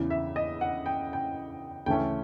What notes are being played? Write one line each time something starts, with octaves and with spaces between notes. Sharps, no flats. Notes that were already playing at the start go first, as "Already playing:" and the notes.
Already playing: E2 C#3 E3
E5
D#5
F#5
G5
G5
D2 C#3 E3 A3 C#4 G5